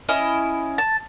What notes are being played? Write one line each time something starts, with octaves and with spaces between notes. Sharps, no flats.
C#4 E4 D#5
A5